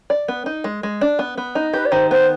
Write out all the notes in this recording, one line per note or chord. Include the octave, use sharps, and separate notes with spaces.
D5
B3
D#4
G#3
G#3
D4
B3
B3
D#4
G4 B4
D5
D#3 C5
B3 C5